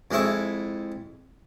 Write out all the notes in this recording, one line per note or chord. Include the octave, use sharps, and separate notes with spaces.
F2 G#3 E4 C#6